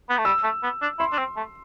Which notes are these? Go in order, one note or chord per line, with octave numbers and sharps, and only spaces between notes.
B3
A3
G3 E6
A3
B3
D4
E4 C6
D4
C4
A3